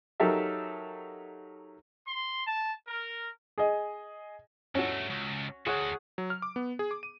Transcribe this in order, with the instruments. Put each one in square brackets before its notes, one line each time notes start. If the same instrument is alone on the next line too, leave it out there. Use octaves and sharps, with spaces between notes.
[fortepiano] F#3 D#4 G4 A4 A#4 E5
[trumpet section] C6
A5
A#4
[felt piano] G#4 D#5
[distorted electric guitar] G2 A3 [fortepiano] C#4 F#4
[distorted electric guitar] C#2
[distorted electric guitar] D2 F#4 [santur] G#4 C#5 F#5
[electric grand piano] F#3
F6
D6
B3
G#4
D6
D#7